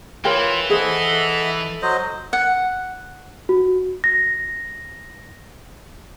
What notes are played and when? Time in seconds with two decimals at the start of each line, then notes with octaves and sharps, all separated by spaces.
0.25 E3 F4 A#4 C#5 G5
0.70 G#4 A4 C5 D#5 E5 F#5
1.82 F#3 C5 D#5
2.33 F#5
3.49 F#4
4.04 A#6